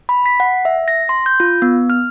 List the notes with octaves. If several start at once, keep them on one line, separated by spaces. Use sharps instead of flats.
B5
B6
F#5
E5
A#6
C6
G6
F4
B3
F6